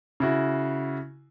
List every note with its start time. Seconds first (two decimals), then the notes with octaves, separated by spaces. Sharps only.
0.20 C#3 E4 F#4